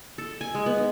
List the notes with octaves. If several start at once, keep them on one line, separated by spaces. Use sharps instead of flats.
A4
G#5
G#3
B3
D#4